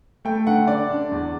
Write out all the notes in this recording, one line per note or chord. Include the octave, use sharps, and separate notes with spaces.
A3 G5
D3 F#5
D3 D5
D4
E2